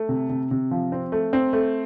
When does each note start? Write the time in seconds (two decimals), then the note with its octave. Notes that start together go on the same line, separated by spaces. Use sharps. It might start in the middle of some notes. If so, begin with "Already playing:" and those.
Already playing: A3
0.09 C3
0.29 C3
0.51 C3
0.71 F3
0.92 C4
1.12 A3
1.33 C4
1.53 A3